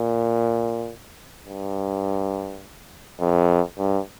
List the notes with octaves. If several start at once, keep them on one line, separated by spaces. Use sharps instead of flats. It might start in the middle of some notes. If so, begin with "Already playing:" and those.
Already playing: A#2
G2
F2
G2